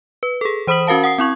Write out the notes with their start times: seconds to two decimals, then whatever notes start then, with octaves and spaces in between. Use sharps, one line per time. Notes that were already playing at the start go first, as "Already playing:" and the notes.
0.23 B4
0.41 G#4 A4
0.67 E3 C5 B5 D#6 B6 F#7
0.87 C#4 F#4 A#4 F5 A5
1.04 F#5 D#6 C7
1.18 C4 E4 C#6 G#6